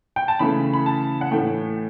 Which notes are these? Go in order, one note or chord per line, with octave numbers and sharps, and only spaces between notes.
G5
A5
C#3 E3 A3 B5
B5
A5
F#5
A2 E3 A3 G5